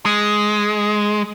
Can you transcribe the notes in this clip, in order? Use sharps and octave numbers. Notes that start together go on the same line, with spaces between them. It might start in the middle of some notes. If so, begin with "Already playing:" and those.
G#3